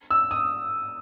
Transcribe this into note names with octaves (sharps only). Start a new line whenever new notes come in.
E6
D#6